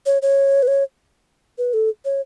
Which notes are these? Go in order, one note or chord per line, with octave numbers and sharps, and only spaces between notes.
C#5
C#5
B4
C#5
B4
A4
C#5